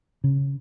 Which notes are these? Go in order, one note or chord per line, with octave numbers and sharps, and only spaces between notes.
C#3